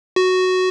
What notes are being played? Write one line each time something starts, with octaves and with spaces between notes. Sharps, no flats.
F#4